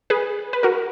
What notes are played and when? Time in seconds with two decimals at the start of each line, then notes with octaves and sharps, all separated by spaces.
0.10 G#4 B4
0.53 B4
0.63 F#4 A#4